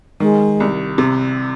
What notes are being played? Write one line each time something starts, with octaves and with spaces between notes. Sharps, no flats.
D#3 G#3
C2
C3